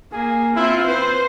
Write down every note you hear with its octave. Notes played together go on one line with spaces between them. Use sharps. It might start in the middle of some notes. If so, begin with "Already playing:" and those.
A#3 G#4
C4 E4 F4
B4 C5